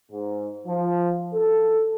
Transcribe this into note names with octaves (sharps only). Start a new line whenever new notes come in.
G#2
F3
A4